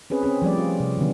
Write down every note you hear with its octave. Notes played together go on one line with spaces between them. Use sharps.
C4 C#4 G#4 B4
C4 C#4 G#4
F3 G3 A3 D5
F4
C3
D3 D#3 F#3 B3 D4